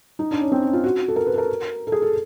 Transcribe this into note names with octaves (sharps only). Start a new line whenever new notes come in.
D#4
D4
C#4
C4
C#4
F4
F#4
A4
A#4
B4
A4
A#4
A4
G#4
A4